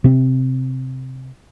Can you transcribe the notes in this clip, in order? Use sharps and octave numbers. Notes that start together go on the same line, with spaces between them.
C3 C4